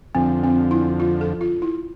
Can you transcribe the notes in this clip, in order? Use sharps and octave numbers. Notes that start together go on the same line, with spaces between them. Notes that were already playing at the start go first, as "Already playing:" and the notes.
F2 D3 F3 C4
C4
E4
F4
A4
F4
E4